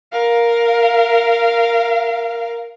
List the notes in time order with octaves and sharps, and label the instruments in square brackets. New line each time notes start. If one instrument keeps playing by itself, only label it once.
[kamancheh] A#4 F5